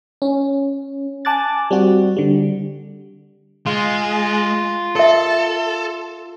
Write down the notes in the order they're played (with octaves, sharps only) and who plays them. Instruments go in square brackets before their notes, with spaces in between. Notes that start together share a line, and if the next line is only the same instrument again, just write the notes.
[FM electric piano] C#4
G#5 A5 D6 F#6 A6
G3 C4 F#4
D3 G3
[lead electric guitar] G#3 [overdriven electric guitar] F4
[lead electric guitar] A4 [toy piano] A#4 E5